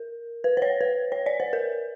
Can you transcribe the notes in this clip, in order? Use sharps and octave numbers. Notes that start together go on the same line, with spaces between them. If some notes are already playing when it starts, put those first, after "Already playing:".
Already playing: A#4
B4
C5
C#5
B4
C#5
D5
C5
A#4